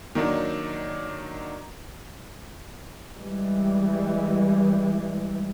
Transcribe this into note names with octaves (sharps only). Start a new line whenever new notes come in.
D#3 F#3 A#3 D4 D#4
E3 G3 G#3